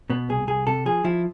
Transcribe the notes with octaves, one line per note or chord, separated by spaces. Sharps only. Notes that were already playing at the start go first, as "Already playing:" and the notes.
B2 B3
C2 G#4
C2 G#4
C3 A4
F3 G#4
F3 E4